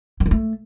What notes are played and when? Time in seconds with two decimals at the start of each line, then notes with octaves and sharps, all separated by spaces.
0.20 D#3
0.26 D3
0.31 A3